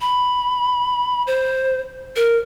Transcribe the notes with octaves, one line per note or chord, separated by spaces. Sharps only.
B5
C5
A#4